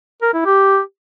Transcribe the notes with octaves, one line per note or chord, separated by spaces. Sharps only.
A#4
E4
G4